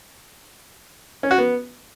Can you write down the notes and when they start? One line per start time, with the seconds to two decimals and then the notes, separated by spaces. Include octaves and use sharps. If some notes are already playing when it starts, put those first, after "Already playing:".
1.23 C#4
1.31 F#4
1.38 B3